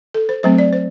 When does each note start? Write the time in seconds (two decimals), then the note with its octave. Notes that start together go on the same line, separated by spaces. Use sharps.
0.14 A4
0.29 C5
0.43 F#3 A3 C4 C5
0.58 D5
0.73 C5